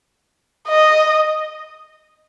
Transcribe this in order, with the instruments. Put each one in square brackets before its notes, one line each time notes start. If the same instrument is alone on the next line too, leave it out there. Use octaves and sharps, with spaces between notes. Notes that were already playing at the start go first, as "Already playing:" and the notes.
[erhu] D#5